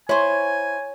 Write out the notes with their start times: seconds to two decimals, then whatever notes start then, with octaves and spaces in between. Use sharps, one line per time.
0.09 E4 C5 C#5 G#5